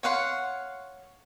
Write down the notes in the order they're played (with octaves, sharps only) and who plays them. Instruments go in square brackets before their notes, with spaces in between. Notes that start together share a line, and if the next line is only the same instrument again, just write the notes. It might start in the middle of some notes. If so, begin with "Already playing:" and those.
[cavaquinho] C#5 F5 F#5 C6